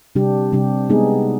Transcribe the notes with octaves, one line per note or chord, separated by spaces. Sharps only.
C3 G3 D4 G4
C3 G3 D4 G4
G#3 B3 D#4 G#4